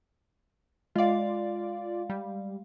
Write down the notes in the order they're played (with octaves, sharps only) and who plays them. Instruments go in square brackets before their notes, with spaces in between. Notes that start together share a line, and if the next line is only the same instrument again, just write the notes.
[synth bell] G#3 F5 [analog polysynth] F4 D5
[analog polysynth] G3